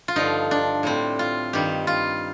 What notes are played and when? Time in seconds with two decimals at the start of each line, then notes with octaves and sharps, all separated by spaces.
0.08 F4
0.16 G2 D3 F3 D#4
0.51 D4
0.83 A2 G3 C4
1.19 F4
1.53 G2 D#3 G3 G4
1.87 F4